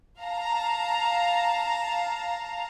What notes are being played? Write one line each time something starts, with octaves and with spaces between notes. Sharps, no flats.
F5 A5 A#5